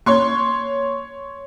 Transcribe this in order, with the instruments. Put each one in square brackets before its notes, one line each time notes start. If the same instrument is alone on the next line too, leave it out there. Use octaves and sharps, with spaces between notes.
[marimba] A#3 [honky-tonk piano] C#5 C6 C#6